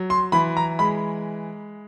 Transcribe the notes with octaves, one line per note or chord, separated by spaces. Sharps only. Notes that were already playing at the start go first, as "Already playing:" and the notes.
Already playing: F#3
C6
E3 B5
A#5
G#3 B5